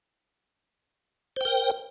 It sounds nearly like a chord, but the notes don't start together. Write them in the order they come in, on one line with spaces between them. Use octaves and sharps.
C5 G5 A#4